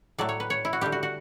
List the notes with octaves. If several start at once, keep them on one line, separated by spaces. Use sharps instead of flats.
A2 F#3 A3 D5
C#5
B4
C#5
E4
F#4
D3 G3 G4
F#4
F#4